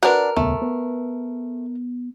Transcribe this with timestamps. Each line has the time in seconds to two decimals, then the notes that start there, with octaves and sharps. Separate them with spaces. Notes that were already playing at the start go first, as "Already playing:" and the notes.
0.03 D4 F#4 A#4 B4 F#5
0.37 D#1 C#2 A3 B3
0.62 B3